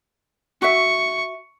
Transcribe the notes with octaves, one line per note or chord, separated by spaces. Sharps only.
F#4 E5 C#6